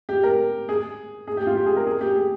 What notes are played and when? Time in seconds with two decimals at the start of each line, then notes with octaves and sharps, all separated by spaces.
0.09 G4
0.23 A#4
0.69 G#4
1.27 G#4
1.37 G4
1.47 F4
1.57 G4
1.66 G#4
1.76 A#4
1.87 G#4
2.01 G4
2.16 G#4